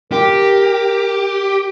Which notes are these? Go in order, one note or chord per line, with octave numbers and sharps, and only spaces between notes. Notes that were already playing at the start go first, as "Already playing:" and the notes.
G4 A#4